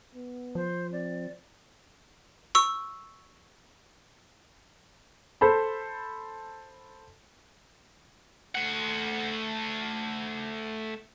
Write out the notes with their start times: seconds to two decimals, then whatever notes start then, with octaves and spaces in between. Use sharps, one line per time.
0.15 B3
0.55 F3 C5
0.92 C4 D5
2.55 C#6 E6
5.41 A4 C5 A5 B5
8.55 A3 F#5